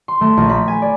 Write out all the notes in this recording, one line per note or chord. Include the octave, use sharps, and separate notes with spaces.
C6
A3
A#1
B5
G#5
D5